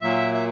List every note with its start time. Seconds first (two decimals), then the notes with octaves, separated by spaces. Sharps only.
0.01 A#2 F#3 A#3 E5
0.34 E5